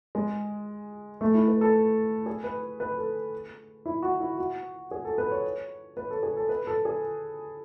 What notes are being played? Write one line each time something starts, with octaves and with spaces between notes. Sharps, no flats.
G#3
A3
E4
B4
A4
G#4
B4
B4
A4
E4
F#4
E4
F#4
G#4
A4
B4
C#5
B4
A4
G#4
A4
B4
A4
G#4